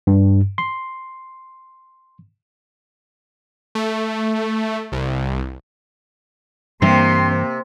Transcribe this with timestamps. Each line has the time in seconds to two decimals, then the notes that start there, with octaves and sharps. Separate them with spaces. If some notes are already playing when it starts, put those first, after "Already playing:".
0.07 G2
0.58 C6
3.75 A3
4.92 C2
6.82 G2 C3 E3 G3 A#3 C4 C6